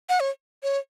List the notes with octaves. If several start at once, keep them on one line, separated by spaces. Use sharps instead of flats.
F#5
C#5
C#5